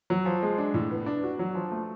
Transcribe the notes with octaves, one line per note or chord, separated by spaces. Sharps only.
F#3
F3
G#3
D4
A2
B3
D4
F#4
F#3
F3
A3